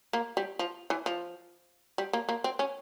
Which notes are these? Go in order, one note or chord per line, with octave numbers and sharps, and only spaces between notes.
A#3
G3
F3
E3
F3
G3
A#3
A#3
C4
C#4